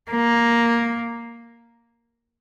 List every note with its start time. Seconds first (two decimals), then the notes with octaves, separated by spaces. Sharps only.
0.11 A#3